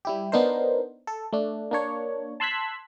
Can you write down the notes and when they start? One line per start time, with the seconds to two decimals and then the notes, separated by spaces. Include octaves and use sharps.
0.05 G3 E4 G4
0.32 B3 D4 D#4 A#4 C5
1.07 A4
1.33 A3 D4
1.71 A#3 D4 C#5
2.40 A5 C6 E6 F#6 G#6 B6